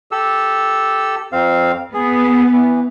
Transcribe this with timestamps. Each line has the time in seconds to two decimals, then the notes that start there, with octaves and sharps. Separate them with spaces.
0.11 G4 A4 E6
1.32 F2 C4 F5
1.94 B3 G#4
2.52 E3